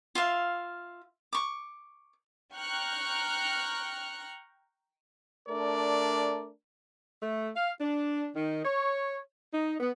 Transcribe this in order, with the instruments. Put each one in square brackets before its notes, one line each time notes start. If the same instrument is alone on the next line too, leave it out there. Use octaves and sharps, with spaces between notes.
[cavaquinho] F4 E5 F5
C#6 D6
[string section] G5 A#5 C#6 F6 F#6
[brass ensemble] A3 D4 A#4 D5
[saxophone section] A3
F5
D4
D#3
C#5
D#4
B3